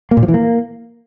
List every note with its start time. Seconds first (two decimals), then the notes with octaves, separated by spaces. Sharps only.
0.11 A#3
0.17 A#2
0.23 F3
0.28 E3
0.34 A#3